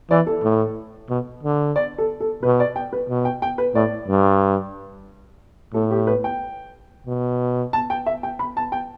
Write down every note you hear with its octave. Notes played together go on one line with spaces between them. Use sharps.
E3 D5
A4
A2
B2
D3
D5
A4
A4
B2 B4
D5
G5
B4
B2
G5
G5
B4
A2 D5
G2
A2 A4
G4
B4
G5
B2
A5
G5
E5
G5
B5
A5
G5